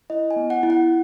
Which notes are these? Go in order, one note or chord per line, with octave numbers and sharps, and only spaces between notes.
E4 D#5
G#5
B3
F#5
E4
F#5